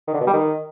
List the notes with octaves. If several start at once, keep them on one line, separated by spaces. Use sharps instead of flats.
D#3
D3
B2
G3
D#3